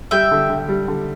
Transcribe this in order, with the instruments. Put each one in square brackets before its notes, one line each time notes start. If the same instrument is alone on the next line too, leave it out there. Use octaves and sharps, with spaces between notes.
[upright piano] G3 [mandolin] E5 G5
[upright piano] D3
D3
G3
D3